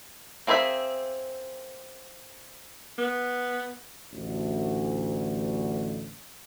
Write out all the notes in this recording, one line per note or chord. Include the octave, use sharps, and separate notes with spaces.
A#3 C4 G#4 B4 E5
B3
A1 D2